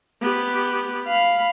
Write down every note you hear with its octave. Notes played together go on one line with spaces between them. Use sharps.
B3 G4
F5 B5